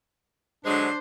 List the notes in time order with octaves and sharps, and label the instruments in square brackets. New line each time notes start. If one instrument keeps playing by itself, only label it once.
[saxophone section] D3 F#3 G#3 [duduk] D4 [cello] C5